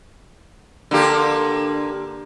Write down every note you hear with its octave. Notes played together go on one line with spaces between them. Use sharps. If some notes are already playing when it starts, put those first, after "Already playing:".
D3 A#3 G4